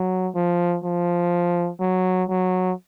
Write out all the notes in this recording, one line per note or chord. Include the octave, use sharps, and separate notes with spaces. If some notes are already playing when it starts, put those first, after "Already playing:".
Already playing: F#3
F3
F3
F#3
F#3